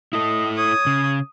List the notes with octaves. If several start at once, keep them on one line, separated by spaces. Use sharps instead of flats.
E4 A4 D#5
C#5 D#6
C#3